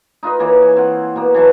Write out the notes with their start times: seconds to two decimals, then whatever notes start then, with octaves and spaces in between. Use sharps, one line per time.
0.23 D#4 F4 B4 D#5
0.39 E3 A#3 C#5
0.62 G#5
0.76 C4 F#5
1.16 B2 A#3
1.34 E3 F#3 A5 C#6